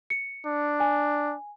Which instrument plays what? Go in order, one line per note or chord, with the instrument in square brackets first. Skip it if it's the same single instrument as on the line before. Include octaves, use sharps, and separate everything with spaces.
[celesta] C#7
[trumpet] D4
[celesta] G#5